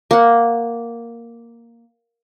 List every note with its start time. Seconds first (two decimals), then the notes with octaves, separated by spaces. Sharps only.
0.11 A#3 F#5